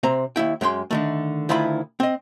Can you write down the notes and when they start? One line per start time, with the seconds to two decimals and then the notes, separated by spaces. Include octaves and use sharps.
0.03 C3 C4 A#5
0.36 D#2 C#3 E4 G5
0.61 F#2 G#3 G5 C6
0.91 D3 D#3 A3
1.49 D2 D#3 E4 F4 B5
2.00 C4 D#5